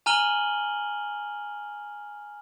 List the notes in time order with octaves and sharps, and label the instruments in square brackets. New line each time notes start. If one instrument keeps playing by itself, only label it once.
[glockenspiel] G#5 A#5 F6 D#7 F#7 G7